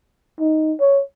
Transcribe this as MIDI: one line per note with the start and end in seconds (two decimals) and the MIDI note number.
0.40 0.74 63
0.80 1.01 73